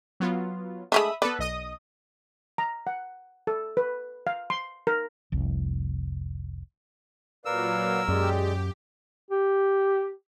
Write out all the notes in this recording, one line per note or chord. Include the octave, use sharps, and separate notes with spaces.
F#3 B3 F4
G#3 A3 D4 E5 B5 D#6
B3 A4 B4 D5
B1 D#5 D#6
A#5
F#5
A4
B4
F5
C6
A#4
F1 C2
A#2 F#3 A#4 B4 D5 F5 E6
F#2 G#3 G4 G#4 D5
G4